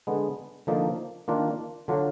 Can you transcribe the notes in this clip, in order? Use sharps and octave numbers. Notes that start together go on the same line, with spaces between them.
D3 G#3 B3
D3 F3 A#3 D#4
D#3 A#3 D4 F4
D3 F#3 D4 F4